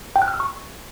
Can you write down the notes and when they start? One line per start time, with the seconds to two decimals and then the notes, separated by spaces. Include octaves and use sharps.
0.16 G5
0.22 F#6
0.28 F6
0.34 E6
0.40 C#6